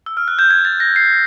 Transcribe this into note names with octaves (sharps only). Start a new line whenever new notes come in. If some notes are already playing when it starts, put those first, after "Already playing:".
E6
F6
F#6
G6
G#6
A6
A#6
C7